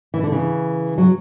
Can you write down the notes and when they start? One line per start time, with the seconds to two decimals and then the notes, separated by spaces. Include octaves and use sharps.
0.14 E3
0.23 D3
0.32 C#3 E3
0.98 F#3